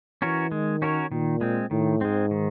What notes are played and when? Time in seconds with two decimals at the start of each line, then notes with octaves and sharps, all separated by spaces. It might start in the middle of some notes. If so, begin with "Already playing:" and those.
0.22 E3 C#4 F#4 A#4 C#5
0.51 D#3 G#3
0.82 C#4 F#4 A#4 C#5
1.12 A#2 D#3
1.41 G#3 C4
1.71 A2 D#3
2.01 G#2 G#3 C4
2.31 D#3